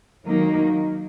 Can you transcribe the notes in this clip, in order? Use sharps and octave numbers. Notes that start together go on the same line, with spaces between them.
D#3 F#3 A#3 D#4